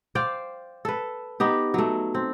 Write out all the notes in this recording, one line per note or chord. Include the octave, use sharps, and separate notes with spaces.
C5 D5 F5 G5
A4 B4
B3 D#4 G4
F#3 A3
C4